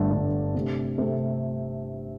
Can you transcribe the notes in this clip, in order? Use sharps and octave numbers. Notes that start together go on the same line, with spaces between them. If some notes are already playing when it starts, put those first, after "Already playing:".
Already playing: G1 G2 D3 A3 D4
G1 G2 D3 A3 D4
C3 A3 C4 G4
C3 A3 C4 G4